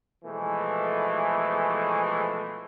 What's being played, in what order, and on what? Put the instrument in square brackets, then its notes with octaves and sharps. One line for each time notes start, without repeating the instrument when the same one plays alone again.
[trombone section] B2 E3 F3 G#3 A3